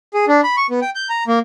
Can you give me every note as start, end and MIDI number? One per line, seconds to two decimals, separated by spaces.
0.14 0.25 68
0.28 0.41 62
0.44 0.56 83
0.57 0.67 85
0.70 0.80 59
0.82 0.90 79
0.95 1.09 91
1.09 1.24 82
1.28 1.39 58